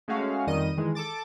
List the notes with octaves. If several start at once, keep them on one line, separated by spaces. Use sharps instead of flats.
G#3 A3 C#4 F#4 F5
F2 D#3 G3 D#5 D#7
D#3 E3 G#3
A4 A5 D6 A6